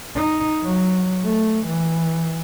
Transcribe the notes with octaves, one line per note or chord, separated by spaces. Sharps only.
D#4
F#3
A3
E3